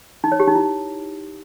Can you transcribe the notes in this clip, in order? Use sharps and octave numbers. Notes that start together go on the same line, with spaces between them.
D#4
C#5
G4
D#4
E4